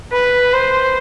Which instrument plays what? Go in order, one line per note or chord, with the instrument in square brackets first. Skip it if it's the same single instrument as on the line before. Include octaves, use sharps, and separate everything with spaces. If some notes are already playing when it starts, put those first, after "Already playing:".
[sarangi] B4
C5